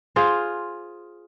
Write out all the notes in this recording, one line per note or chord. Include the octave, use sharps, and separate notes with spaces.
F4 G#4 C5